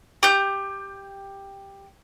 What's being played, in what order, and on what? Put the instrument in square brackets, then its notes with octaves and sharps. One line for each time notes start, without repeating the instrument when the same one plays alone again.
[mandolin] G4 G6